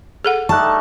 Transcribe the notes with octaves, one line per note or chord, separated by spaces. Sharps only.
G#4 A4 F#5
G3 A3 D#4 A5 C#6 F#6